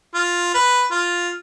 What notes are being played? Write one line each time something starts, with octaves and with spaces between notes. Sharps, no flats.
F4
B4
F4